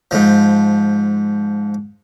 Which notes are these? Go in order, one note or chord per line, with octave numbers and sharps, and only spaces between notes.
G#2 F3